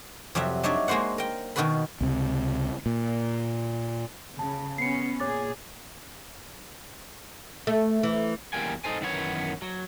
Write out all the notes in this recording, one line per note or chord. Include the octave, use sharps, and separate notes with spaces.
F2 C3 F#3 G3 E5
D4 D#4 C#5 D5 E5
G#3 A#3 F#4 C5 F#5
A#4 G5
B2 D#3 B3 F#4 B4 B5
C#2 C3
A#2
C#3 A5
B3 C#4 C7 C#7
A#2 G#4 C#5 D6 A6
A3
E3
E2 G3 A#3 G5 G#5
D#4 A4 C5 G#5
F#2 D#3 E3 B3 F#4 C#5
F#3